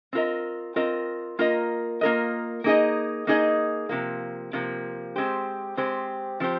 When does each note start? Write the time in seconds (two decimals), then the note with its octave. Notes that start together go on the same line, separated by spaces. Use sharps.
0.13 C4 F4 A#4 D#5
0.76 C4 F4 A#4 D#5
1.39 A#3 F4 A#4 D#5
2.01 A#3 F4 A#4 D#5
2.64 A#3 D#4 G#4 D#5
3.27 A#3 D#4 G#4 D#5
3.89 C3 F3 A#3
4.53 C3 F3 A#3
5.16 G#3 C4 G4 C5
5.77 G#3 C4 G4 C5
6.40 F3 C4 G4 C5